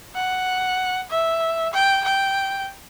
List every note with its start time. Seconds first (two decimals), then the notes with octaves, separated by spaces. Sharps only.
0.15 F#5
1.10 E5
1.73 G5
2.05 G5